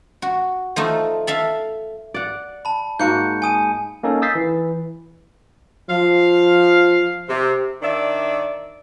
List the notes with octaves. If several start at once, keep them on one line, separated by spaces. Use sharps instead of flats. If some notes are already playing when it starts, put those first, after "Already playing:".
F#4
F3 A3 D#4
A4 E5 F5
D5 F#5
A5 B5
G#2 A#3 F#4 G6 C#7
G#5 D#6 D#7
A#3 C#4 D#4 A4
D#6 E6 G6 A6 B6 C7
E3
F3 F5
C3
D#3 D4 D5 E5